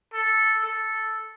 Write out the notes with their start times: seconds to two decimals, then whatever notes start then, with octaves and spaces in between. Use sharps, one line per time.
0.13 A4
0.64 A4